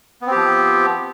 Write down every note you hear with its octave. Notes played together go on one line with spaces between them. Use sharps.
F3 B3 C4 G4